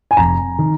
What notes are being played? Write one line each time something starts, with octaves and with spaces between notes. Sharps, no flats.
G#5
F1 A#5
D#3